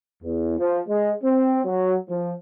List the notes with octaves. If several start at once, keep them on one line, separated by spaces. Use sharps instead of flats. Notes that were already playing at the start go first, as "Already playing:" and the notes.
E2
F3
G#3
C4
F#3
F3